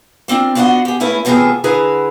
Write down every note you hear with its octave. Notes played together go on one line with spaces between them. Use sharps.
A#3 C4 D4 F4
B3 D4 F4 F#4 D#5 F#5
G4 G#4
A3 A#3 C#4 E4 G#4 B4
A2 C3 E3 B3 F4 G#4
D3 E4 G#4 B4 A#5